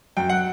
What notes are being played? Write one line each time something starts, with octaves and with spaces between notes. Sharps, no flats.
F#2 G5
F#5